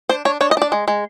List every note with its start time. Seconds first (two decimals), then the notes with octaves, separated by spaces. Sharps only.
0.09 D4 C5
0.25 D4 C#5
0.41 D4 C#5
0.51 D#5
0.57 D4 D5
0.72 G#3
0.88 G#3